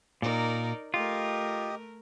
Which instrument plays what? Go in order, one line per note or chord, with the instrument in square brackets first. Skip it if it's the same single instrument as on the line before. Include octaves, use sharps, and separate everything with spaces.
[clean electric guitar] A#2 [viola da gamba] D#4 A#4 D5
[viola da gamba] A3 A#4 [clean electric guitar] F4 [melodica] G4 D#5